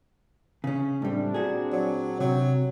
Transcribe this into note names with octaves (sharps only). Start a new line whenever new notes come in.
C#3 C#4
A2 G3 C4 D4
A#2 F#4 G#4
F#3
C3 F#3